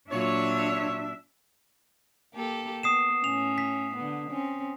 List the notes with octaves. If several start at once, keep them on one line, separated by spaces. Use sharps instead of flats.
A#2 F#3 D4 F4 C#5 E5
A#3 G4 A4
B3 D#6 C7 E7
A2 C#4 F7
B6
D3 B3
C4 C#4